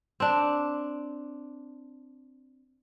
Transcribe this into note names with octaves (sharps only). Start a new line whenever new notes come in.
C4 D4